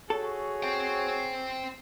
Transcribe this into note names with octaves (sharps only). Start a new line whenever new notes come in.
F#4 G#4 A4 C#5
C5 G5